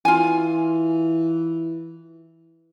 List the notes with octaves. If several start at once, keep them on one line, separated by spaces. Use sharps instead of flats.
E3 F4 G#5